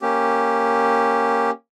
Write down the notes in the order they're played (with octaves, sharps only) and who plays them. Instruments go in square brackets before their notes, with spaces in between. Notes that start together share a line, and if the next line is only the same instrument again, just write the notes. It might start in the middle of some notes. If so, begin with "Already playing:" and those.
[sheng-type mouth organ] A#3 C#4 G4